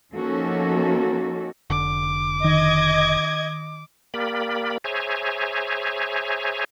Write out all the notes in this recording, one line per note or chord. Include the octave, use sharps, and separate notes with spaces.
F3 A#3 C#4 D#4 F#4 A4
F1 D3 D6
D#3 D#5 G#6
A#3 G4 A#4 D5 B5
G#4 C5 C#5 E5 G#5 A#5